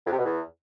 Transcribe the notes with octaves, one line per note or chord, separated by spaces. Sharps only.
F2
C3
B2
E2